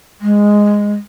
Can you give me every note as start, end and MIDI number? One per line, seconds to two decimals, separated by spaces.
0.21 0.93 56